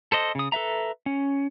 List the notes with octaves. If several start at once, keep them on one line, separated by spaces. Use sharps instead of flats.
A4 C5 D#5
C#3 D#6
A4 B4 E5 A#5
C#4